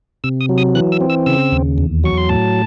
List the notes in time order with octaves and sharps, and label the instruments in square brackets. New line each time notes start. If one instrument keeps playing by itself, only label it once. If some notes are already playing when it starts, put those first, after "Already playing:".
[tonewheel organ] C3 E6
D#6
F#3
D#6
E3 F#6
E6
C4
E6
C#3 E6
D#2
E2
F#3 C#6
C6
A2 A5